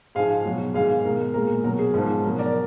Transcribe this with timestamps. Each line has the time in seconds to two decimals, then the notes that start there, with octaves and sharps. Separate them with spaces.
0.15 G#2 F3 G#3 F5 G#5
0.45 B2 F#3
0.74 G#2 D#3 G#3 F5 G#5
1.05 B2 G#3 A#4
1.34 A#2 G#3 A#4
1.64 B2 F#3 A#4
1.79 G#4
1.94 G#2 F3 G#3
2.24 B2 F#3 A#4
2.39 A#4 D5